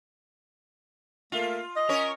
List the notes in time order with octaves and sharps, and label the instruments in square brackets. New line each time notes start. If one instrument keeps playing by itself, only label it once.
[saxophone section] A3 A#3 E5 [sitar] F4
[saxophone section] D#5
[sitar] C#4 A#4 C#5